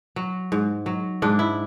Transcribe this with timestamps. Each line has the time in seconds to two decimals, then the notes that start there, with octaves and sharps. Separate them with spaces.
0.16 F#3
0.52 G#2
0.86 F#3
1.22 G#2 D4
1.39 E4